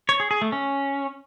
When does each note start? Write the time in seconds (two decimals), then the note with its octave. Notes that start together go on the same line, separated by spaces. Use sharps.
0.09 C#5
0.20 G#4
0.31 G#4
0.41 A3
0.52 C#4